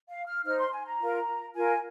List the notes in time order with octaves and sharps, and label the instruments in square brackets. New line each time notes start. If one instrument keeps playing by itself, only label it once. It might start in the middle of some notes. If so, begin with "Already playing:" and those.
[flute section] F5
F6
D#4 C5 F6
C6
G#5
A#5
F4 A#4
F4 A#4 G#5